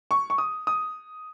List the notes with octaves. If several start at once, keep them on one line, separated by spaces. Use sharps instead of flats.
C#6
C#6
D#6
D#6